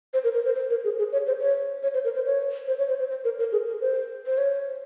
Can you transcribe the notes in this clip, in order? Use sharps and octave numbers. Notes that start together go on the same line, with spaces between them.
C5
A#4
A#4
C5
C5
A#4
G#4
G#4
C#5
C5
C#5
C#5
C5
A#4
C5
C#5
C5
C#5
C5
C5
C5
A#4
A#4
G#4
A#4
C5
C5
C#5